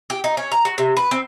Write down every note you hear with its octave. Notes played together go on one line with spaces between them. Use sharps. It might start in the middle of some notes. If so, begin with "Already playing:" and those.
G4
D#4
C#4
A#5
F#4
C3
B4
C4